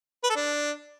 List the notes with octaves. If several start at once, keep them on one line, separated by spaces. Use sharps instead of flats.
B4
A4
D4